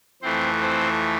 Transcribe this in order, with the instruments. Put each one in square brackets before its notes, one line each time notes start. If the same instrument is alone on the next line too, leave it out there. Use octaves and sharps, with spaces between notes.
[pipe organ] F2 E3 A3 C4 C5
C4 C5